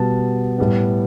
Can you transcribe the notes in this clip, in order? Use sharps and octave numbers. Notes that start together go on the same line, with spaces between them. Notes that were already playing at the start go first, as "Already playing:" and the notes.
Already playing: B2 G3 B3 A5
A2 G3 B3